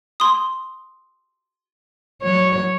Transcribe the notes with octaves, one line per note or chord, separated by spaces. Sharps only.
C6 D#6
F#3 C#5